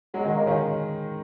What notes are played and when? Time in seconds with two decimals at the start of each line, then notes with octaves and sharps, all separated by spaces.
0.14 F#3 G#3
0.25 D#3 G#3 D#4
0.36 A#3
0.46 D#3 C#4 D#4